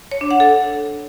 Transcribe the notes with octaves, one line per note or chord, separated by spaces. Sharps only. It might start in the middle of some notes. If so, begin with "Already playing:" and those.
C#5
D4
F#5
A4